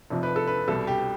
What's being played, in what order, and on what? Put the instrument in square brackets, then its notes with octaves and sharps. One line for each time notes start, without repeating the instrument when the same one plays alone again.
[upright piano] F1 F2 C3 F3
B4
A4
B4
C2 B2 G3 A4
G4